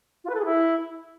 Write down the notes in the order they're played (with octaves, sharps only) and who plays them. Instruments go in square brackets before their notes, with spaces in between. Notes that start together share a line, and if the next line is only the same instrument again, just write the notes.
[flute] F4
B4
A4
G#4
E4